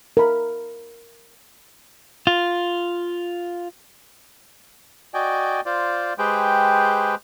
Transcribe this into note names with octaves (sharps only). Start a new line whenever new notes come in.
A#4 B5
F4
F#4 D5 D#5 G5 G#5
F4 C5 D5
G#3 G4 G#4 B4 C5 G5